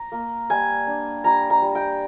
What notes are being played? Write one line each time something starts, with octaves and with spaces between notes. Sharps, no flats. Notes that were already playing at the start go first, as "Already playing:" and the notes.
Already playing: A#5
A#3
G3 G#5
D4
G3 A#5
A#5
G3
G5